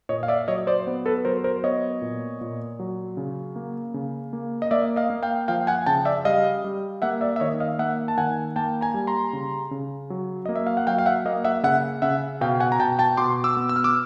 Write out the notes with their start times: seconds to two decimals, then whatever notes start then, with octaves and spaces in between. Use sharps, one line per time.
0.09 A#2 C#5 D#5
0.23 F5
0.28 D5 E5
0.48 F#3 C#5 D#5
0.67 C5 D5
0.87 B3
1.06 A4 B4
1.25 F#3 A#4 C5
1.44 A#4 C5
1.64 B3 C#5 D#5
2.02 A#2
2.41 A#2
2.79 F#3
3.17 C#3
3.56 A#3
3.94 C#3
4.33 A#3
4.62 D#5
4.71 A#3 D5 E5
4.96 D#5 F5
5.10 A#3
5.23 F5 G5
5.48 F3 F5 G5
5.67 F#5 G#5
5.86 C#3 G5 A5
6.05 D5 E5
6.25 G3 D#5 F5
6.64 G3
7.02 A#3 E5 F#5
7.21 D5 E5
7.36 E5
7.40 D#3 C#5 D#5
7.60 D#5 F5
7.79 A#3 E5 F#5
8.08 A5
8.18 D#3 F#5 G#5
8.56 A#3 G5 A5
8.81 G#5 A#5
8.94 G3
9.07 A#5 C6
9.33 C#3
9.71 C#3
10.10 F#3
10.46 A#3 D#5
10.56 E5
10.67 F5
10.77 F#5
10.87 F#3 F5 G5
10.98 F5
11.06 E5 F#5
11.25 A#3 D#5 F5
11.45 E5 F#5
11.63 C#3 E5 F#5
12.02 C#3 E5 F#5
12.41 B2 F5 G5
12.60 F#5 G#5
12.72 A#5
12.79 B2 G5 A5
12.99 G5 A5
13.17 B2 C6 D6
13.44 D6 E6
13.57 B3
13.69 E6
13.76 F6
13.84 D6 E6